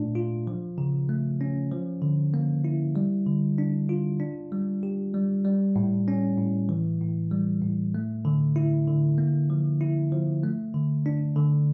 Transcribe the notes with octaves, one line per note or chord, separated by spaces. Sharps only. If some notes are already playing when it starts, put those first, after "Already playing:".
Already playing: A#2 A3 D4
F4
F3
C#3
A3
C#4
F3
D3
A#3
E4
G3
D3
D4
F4
D4
G3
G4
G3
G3
A2
C#4
A2
E3
A2
G3
A2
A3
D3
E4
D3
A#3
F3
E4
F3
A3
D3
D4
D3